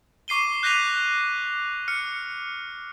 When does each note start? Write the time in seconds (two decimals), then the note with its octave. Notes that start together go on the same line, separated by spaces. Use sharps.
0.28 C#6 D6 C7 D#7 G7
0.63 F#6 G6 A#6 B6 D#7 F7
1.88 F6 C#7